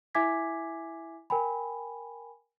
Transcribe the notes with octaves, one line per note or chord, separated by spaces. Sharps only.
E4 E5 G#5 D6 G#6 B6
A#4 G5 G#5 B5